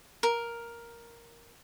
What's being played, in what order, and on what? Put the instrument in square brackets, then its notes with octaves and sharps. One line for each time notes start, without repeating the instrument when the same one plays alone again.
[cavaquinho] A#4